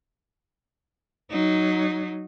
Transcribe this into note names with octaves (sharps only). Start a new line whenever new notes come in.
F#3 D#4